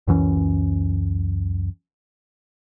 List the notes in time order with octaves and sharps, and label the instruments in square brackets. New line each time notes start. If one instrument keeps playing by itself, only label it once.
[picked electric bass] C#2 F#2 E3 C#4